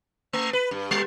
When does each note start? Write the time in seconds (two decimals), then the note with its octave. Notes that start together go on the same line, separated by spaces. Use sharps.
0.33 A3
0.53 B4
0.71 G2
0.91 G3